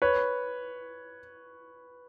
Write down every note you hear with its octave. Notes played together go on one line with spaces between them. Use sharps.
B4 C#5